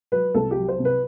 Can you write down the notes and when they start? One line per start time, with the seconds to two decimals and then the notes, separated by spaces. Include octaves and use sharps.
0.12 F#3 B4
0.34 C2 A4
0.51 G4
0.56 F#3
0.68 C5
0.79 C3
0.85 B4